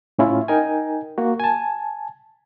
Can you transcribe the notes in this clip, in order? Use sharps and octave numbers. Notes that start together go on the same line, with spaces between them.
A2 C#4 E4 F4
D#4 A#4 G5 G#5
A#3 F#4
G#5 A5